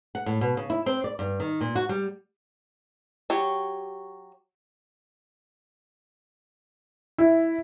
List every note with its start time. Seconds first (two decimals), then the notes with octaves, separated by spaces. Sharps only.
0.15 F#5
0.26 A2
0.41 B2
0.57 C#3
0.70 E4
0.86 C4
1.04 D5
1.19 G2
1.40 D#3
1.61 A#2
1.76 F#4
1.89 G3
3.30 F#3 G4 C#5
7.18 E4